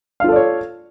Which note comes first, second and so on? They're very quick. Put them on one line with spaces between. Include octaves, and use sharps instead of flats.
F5 F4 A4 D5 C#5